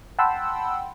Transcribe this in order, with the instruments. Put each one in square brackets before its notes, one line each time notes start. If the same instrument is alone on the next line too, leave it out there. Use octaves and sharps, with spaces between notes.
[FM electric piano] F#5 G5 A5 B5 C6 E6